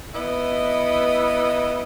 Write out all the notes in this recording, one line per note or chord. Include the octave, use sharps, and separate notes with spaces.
B3 E4 B4 D#5